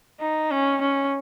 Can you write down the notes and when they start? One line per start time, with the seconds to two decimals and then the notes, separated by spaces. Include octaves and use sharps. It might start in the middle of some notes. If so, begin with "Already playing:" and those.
0.20 D#4
0.51 C#4
0.81 C#4